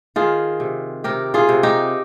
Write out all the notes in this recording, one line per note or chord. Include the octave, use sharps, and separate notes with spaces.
D#3 F4 G#4
C3
C3 G4 A#4
F4 G#4
C3
D#4 G4